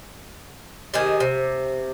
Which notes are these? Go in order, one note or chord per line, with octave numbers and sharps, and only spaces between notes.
C3 D#3 G#4 D#5
C3 C5